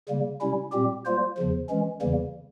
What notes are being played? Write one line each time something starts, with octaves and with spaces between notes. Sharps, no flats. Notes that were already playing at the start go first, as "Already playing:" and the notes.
C#3 G3 A#3
C3 G3 C#4 E4
A#2 G3 C4 G4
G3 A#3 F4 C5
E2 C#3 F3
E3 G#3 C#4
E2 C#3 E3 G3 A#3